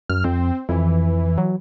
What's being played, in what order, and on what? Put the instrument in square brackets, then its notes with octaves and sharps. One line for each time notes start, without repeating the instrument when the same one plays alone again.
[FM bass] F#2 [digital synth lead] F6
[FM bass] F2 [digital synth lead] C4
[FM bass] F2 [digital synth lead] E3
[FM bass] F#3